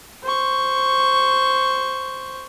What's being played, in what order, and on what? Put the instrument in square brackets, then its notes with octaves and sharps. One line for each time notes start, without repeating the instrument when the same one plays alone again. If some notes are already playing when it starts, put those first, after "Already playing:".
[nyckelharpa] C5 C#6